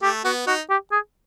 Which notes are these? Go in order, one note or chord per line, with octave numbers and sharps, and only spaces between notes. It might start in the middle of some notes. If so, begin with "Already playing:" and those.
A3 G4
B3 F#4
D#4 F#4
G4
G#4